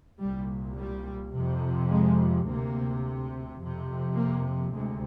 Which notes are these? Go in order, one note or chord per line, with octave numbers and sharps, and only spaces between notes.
C2 A#2 G3
G3
F2 C3
G#3
D2 C3 A#3
F2 C3
A#3
D2 C3 G#3